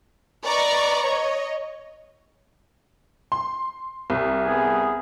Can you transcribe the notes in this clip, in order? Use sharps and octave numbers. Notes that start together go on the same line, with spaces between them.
B4 D5 D#5 A#5 C#6
C#5 D#5
C6
C2
B3 G#4